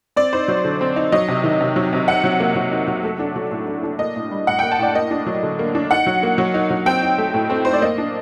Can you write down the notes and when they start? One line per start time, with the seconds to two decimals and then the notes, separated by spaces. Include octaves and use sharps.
0.16 C4 D5
0.33 D#4 C5
0.48 F#3
0.65 D3
0.81 C4
0.96 D#4
1.12 F#3 D#5
1.28 C3
1.44 D#3
1.61 C3
1.76 F#3
1.93 C3
2.08 D#4 F#5
2.24 F#3
2.40 A#3
2.56 F#3
2.72 D#4
2.88 F#3
3.04 A3
3.19 D4
3.36 F#3
3.51 A2
3.68 A3
3.83 D4
3.99 A#3 D#5
4.16 A2
4.31 G3
4.47 A2 F#5
4.59 G5
4.63 A#3
4.72 A5
4.79 A2 D5
4.95 A#3 D#5
5.11 D4
5.27 F#3
5.43 D3
5.59 A#3
5.75 D4
5.91 D#4 F#5
6.06 F#3
6.23 A#3
6.38 F#3
6.54 D#4
6.70 F#3
6.86 C4 G5
7.02 D#4
7.18 A3
7.34 A2
7.50 C4
7.65 D#4 C5
7.73 D5
7.82 A#3 D#5
7.98 D4